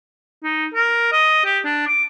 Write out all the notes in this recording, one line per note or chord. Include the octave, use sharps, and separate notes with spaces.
D#4
A#4
D#5
G4
D4
D6